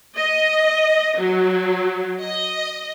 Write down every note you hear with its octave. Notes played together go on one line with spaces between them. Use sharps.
D#5
F#3
D#5